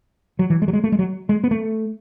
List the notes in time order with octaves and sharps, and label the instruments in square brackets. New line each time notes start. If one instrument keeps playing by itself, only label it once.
[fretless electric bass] F#3
E3
G#3
F#3
G#3
A3
G#3
F#3
G#3
B3
A3